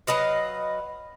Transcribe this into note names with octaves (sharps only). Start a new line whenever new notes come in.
F#3 B4 D#5 F5